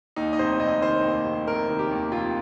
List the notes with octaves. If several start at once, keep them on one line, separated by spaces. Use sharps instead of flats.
D#2 D#4
D#5
F1 C5
F1 D#5
D#3 C5
D#2
F1
F1 A#4
D#3
G4
D#2
F1 F4